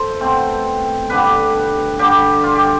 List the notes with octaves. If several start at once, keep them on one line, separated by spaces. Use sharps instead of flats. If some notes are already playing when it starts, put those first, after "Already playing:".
Already playing: A4 C5
B2 A3 C4
G2 D3 G3 B4
G2 D3 G3 G4
F4
G4